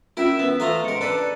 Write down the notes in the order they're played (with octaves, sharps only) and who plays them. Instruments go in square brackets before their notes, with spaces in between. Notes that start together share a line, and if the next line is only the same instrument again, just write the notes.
[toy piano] C#4 F4 [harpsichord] E4 A#4 [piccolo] E5
[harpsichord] B3
[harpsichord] A3 F4 E5 [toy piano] A4 B4 [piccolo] A#5
[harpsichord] G#2 A#4 [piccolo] C#7
[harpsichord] D4 A4 B4 [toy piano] A#5